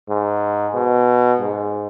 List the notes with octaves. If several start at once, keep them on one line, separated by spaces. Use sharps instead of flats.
G#2
B2
G#2